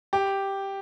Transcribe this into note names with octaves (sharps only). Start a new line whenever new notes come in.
G4